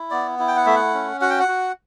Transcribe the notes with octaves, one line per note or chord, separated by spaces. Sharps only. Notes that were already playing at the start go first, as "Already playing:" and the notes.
Already playing: E4
B3 D5
E4
G5
F#5
A3 E5
F#5
C#4
F#4 F#5
G5
F#5
F#4